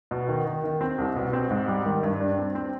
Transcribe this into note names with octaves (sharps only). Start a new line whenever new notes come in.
B2
D#3
D#3
D#3
C4
C2
B2
C4
G#2
G3
D#3
G2
D4
C4
C4